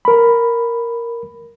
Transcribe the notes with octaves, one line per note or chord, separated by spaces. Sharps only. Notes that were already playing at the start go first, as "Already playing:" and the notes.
A#4 B5